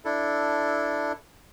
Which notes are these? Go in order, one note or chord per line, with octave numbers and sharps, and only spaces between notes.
D4 E4 A4